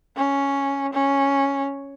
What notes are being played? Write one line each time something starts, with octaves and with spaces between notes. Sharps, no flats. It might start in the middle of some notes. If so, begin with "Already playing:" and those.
C#4
C#4